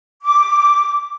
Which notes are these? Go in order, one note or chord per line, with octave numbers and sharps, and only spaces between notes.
D6